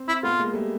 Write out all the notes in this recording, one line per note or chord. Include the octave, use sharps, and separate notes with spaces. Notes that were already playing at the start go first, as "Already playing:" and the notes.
Already playing: C4
E4
A3 B3 F4
G#3 A#3
G3 A3